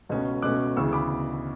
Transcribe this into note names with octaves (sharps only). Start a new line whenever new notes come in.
C#2 B2 A3 C#4
C#2 B2 A3 C#4 D6 F#6
D2 C#3 E3 B3 C#6 E6
B5 D6